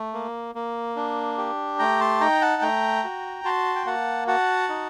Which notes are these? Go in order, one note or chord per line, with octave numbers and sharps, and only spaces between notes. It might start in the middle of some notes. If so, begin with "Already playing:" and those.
Already playing: A3
A#3
A#3
D4
G4
A3 G5 A#5
A5 C6
D#4 G5 A#5
F#5 A5
A3 G5 A#5
F#4
F#4 A5 C6
G5
A#3 F#5 A5
F#4 F#5 A5
D#4